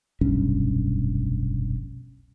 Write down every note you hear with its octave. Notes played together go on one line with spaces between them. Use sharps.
F1 B1 G2 C#4